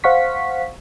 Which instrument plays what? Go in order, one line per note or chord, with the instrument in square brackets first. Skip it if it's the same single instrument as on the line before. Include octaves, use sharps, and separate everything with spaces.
[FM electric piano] C5 F5 F#5 C#6 B6